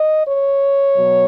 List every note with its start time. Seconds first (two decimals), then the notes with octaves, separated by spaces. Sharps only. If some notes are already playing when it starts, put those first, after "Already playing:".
Already playing: D#5
0.26 C#5
0.96 B2 F#3